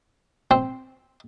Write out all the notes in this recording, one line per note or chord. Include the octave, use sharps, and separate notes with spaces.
C4